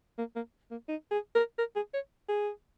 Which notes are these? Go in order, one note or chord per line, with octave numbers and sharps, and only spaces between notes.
A#3
A#3
A#3
D#4
G#4
A#4
A#4
G#4
C#5
G#4